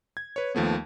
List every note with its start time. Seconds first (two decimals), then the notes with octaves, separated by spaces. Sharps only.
0.17 G#6
0.36 B4 C#5
0.55 D#2 F3 A3 B3